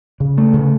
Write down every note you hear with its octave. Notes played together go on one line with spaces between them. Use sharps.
C#3
A3
C#3